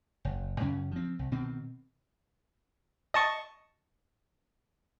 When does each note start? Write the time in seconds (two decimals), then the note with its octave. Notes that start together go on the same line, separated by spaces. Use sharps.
0.25 F#1
0.60 F#2 C#3 C#4
0.91 F3 C4
1.19 C2
1.32 B2 D#3 C4
3.14 D#5 A5 C#6